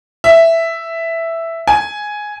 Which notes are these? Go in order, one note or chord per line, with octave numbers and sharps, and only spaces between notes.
E5
G#5